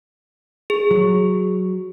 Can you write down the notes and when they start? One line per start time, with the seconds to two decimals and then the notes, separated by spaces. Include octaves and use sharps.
0.70 G#4
0.91 F#3